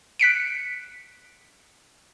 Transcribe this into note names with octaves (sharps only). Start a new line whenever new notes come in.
F#6 B6 C#7 D7